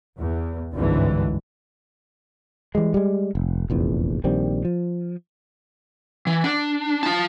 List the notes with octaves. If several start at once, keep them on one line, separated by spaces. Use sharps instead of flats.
E2
G#1 C#2 G2 D3 E3
E3 G3 G#3
G3 G#3
F1
F1 A#1 E2
A#1 D#3 G3 C4
F3
E3
D4
F4 A5